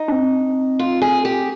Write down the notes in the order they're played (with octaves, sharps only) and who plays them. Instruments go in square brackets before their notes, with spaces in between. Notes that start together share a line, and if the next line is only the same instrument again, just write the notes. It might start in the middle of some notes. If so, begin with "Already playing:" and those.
Already playing: [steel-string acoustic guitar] D#4
[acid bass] D4
C4
[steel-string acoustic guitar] F4
G#4
G4